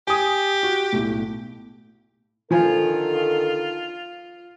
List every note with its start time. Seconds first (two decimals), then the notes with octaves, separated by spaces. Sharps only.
0.07 G4 G#5 D#6
0.63 F#4
0.92 B1 A2
2.51 D3 D#3 F3 F4 A4 G#5